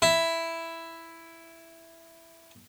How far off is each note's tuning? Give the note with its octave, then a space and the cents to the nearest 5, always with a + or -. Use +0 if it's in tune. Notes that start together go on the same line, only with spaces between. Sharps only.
E4 +5